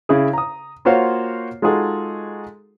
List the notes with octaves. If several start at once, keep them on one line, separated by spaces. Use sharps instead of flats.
C#3 E4 G#4
A#5 D#6
A#3 F4 F#4 C5 C#5 F5
G#3 D#4 F4 F#4 G#4 A4